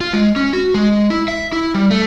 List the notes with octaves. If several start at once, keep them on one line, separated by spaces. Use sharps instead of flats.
F4
G#3
C#4
F#4
G#3
E4
E5
E4
G3
A3